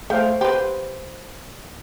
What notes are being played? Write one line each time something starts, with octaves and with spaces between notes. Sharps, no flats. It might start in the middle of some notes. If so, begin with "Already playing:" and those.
A3 C5 F5 G5
G4 B4 C5 C6